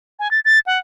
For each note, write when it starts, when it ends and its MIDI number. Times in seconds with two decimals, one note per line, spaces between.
0.19 0.31 80
0.31 0.40 93
0.45 0.59 93
0.66 0.79 78